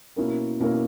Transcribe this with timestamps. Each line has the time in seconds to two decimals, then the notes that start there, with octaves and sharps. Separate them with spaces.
0.16 B2 A#3 C#4 E4 A#4
0.59 B2 A#3 C#4 E4 A#4